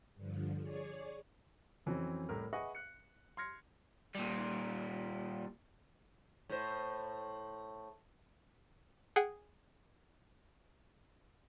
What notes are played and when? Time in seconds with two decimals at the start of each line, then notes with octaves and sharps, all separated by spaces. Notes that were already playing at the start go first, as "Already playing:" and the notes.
0.16 G2 D3 F3
0.61 G#4 C#5 D5
1.86 F2 E3 F#3 C4 C#4
2.29 C2 A2 A#4
2.53 G#4 B4 D#5 E5 F#5 C#6
2.75 F#6 C#7
3.37 C6 F6 G#6 A#6 C#7
4.15 A#2 G3
6.49 A2 C5
9.16 G#4 F#5 G5